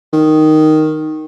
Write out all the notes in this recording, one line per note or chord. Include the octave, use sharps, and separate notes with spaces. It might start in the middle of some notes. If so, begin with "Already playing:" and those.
D#3